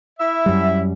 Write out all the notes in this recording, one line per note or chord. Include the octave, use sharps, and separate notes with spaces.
E4 E5
F#2 G3